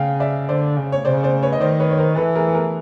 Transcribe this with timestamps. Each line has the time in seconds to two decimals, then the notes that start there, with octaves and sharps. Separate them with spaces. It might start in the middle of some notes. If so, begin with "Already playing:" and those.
Already playing: C#3 F5 G5
0.20 D5 E5
0.48 D3 C5 D5
0.77 C#3
0.92 C#5
1.05 C#3 C5 D5
1.23 C5 D5
1.43 B4 C#5
1.53 D#5
1.60 D#3 C5 D5
1.80 B4 C#5
1.91 C#5
1.98 A#4 C5
2.16 E3 A4 B4
2.35 G#4 A#4
2.48 A4
2.54 G#4 A#4